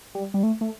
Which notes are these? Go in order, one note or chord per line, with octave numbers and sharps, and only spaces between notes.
G3
G3
A3
A3